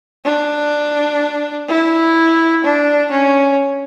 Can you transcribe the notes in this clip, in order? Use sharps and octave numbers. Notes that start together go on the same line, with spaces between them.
D4
E4
D4
C#4